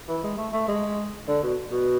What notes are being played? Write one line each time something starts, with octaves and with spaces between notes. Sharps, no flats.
E3
G#3
A3
A3
G#3
D3
B2
B2